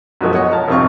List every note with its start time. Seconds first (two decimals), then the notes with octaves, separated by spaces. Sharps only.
0.21 F#2 B2 F3 G#3 A3
0.35 C#5 D#5 F#5
0.51 A#4 A5
0.68 G#1 F2 C3 C4 F4 C#6